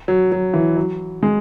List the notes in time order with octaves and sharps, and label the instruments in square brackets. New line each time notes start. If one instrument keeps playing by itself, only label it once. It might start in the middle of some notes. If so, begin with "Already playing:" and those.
[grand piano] F#3
F#3
E3
F#3
G#3